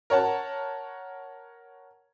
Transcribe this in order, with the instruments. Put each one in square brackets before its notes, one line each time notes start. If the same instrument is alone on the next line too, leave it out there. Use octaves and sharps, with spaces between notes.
[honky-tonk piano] A#4 C#5 F#5 A5